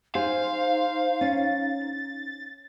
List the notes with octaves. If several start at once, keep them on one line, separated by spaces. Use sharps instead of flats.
D#4 G#4 C5 F5
C#4 A6